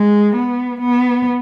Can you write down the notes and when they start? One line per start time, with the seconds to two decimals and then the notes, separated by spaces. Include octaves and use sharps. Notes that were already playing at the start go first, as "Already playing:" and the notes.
Already playing: G#3
0.36 B3
0.81 B3